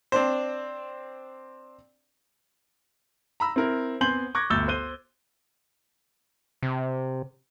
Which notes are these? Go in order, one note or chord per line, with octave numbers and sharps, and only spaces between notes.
C4 D4 C5
A#5 B5 E6
C4 E4 A#4
B3 C4 G#5 C6 G6 F#7
C#6 D6 F#6 G#6 A#6
G1 D2 E6 G6 A6 G7
C5 F#6 D#7 G7
C3